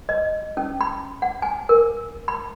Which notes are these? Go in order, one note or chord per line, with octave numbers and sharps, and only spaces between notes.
D#5
C#4
B5
F#5
G#5
A#4
B5